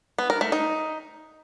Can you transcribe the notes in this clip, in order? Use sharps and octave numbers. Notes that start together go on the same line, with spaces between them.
B3
A#4
A3
D#4